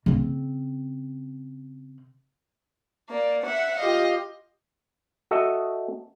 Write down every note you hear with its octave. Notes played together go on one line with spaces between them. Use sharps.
C#3 C4
A#3 D5
E5 F#5
F4 G4 D#5 F5
F#4 A4 D#5 E5